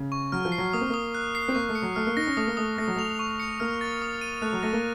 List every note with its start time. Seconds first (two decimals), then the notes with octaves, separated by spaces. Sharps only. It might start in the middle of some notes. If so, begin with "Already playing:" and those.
Already playing: C#3
0.12 C#6
0.32 F#3 F6
0.45 F3
0.52 C7
0.58 F#3
0.73 A#3 D#6
0.81 C4
0.90 A#3 D#6
1.15 F#6
1.35 C7
1.48 C4
1.55 A#3 C#6
1.69 A3
1.75 C#7
1.82 F#3
1.96 A3 F6
2.07 A#3
2.17 D#4 A#6
2.27 C#4
2.37 A3 D#6
2.47 A#3
2.57 A3 D#6
2.78 A3 A#6
2.87 F#3
2.96 A3 F7
3.19 C#6
3.40 C#7
3.60 A#3 F6
3.81 A6
4.02 D#6
4.21 D#7
4.42 A3 F#6
4.53 F#3
4.63 A3 A#6
4.73 A#3